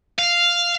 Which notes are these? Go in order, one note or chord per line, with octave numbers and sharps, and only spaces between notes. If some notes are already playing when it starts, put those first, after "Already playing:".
F5